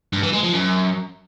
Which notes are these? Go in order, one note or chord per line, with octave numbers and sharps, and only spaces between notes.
G2
E3
G#3
F3
F#2